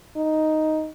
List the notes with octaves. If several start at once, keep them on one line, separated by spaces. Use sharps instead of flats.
D#4